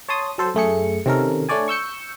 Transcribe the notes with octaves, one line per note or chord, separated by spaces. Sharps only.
C#5 A5 C6 D#6
F#3 A4 C5
F#2 A3 G#4 C#7
C3 D#3 C#4 A4 A#4
A3 D4 C#5 D5 G#5
C#6 E6 G6 C#7